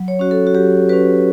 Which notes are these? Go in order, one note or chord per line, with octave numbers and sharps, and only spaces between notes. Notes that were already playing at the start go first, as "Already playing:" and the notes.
Already playing: F#3
C#5
C#4 F#4
A4
F#4
F#3 G4
C#4 F#4 B4